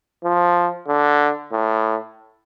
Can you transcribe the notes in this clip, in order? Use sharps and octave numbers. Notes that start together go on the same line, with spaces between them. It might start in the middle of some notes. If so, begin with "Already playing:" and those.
F3
D3
A2